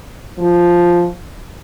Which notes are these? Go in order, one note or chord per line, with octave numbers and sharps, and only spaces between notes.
F3